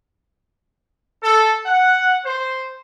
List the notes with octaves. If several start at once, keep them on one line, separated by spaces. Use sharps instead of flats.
A4
F#5
C5